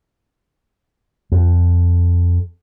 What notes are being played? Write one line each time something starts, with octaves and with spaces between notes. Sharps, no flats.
F2